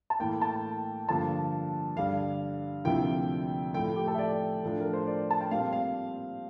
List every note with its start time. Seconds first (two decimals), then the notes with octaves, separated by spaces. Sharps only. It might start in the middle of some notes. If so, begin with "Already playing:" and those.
0.10 A5
0.20 A2 E3 A#3 G5
0.42 A5
1.08 G2 D3 F3 A#3 A5
1.96 G2 D3 G3 F5
2.85 D2 C3 F3 A#3 E4 G5
3.74 A2 F3 A3 G5
3.96 G4
4.08 A4
4.14 E5
4.18 D5
4.62 A2 F3 A3 D4
4.81 A#4
4.93 C5
5.07 D5
5.31 A5
5.41 G5
5.51 A#2 G3 C4 F5
5.73 F5